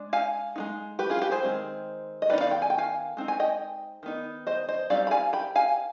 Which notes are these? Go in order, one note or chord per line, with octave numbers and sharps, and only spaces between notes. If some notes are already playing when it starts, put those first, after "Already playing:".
Already playing: G#3 D4
F5 G#5
G#3 B3 D#4
G4 B4
F4 G#4
G4 B4
G#4 C5
D#3 G#3 C4
D#5
D#3 B3 D#4 B4 D5
D5 F5
G5 B5
G#5
G5
F5 G#5
G#3 C4 D#4
G#5
D#5 G5
D#3 B3 D#4
C5 D#5
C5 D#5
G3 C4 D#4 D5 F5
B5
F5 G#5
G5 B5
F5 G#5